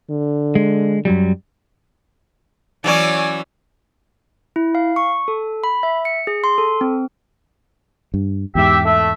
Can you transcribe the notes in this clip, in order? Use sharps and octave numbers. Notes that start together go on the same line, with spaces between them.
D3
G#3
F#2 F#3 G3
E3 F#3 C#4 D5 G#5
E4
F5
C#6
A4
B5
E5
C#7
G#4
C6
A4
C4
G2
E2 G#2 G4 E5
A3 E5